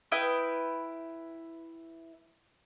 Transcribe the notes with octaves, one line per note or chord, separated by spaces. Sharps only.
E4 B4 G5 D#6